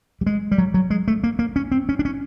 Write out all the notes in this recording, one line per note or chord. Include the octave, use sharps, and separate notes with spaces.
G3
G#3
G3
F#3
F#3
G#3
A3
A#3
A#3
C#4
C4
C#4
D4
C#4